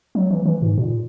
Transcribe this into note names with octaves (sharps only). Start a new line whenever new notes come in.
F#3
E3
E3
G#2
A#2